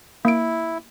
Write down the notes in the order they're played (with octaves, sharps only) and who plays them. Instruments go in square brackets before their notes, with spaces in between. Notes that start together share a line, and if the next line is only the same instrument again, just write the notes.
[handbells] A#3 D7 [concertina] E4